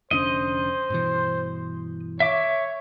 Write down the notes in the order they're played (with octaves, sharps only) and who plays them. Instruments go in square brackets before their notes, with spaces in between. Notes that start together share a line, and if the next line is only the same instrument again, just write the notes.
[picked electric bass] F1 D3 C#4 [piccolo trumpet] C5 [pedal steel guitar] D#5
[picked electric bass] G2 B2 E3
[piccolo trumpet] C#5 [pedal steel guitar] E5 D6